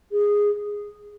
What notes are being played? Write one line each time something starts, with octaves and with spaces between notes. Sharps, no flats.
G#4